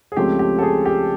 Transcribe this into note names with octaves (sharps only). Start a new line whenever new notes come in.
G#4
C#2 C#3 F3 A3 C4 G4
G4
A4
G#4
G4